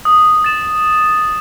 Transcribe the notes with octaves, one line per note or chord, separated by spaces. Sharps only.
D#6
A6 E7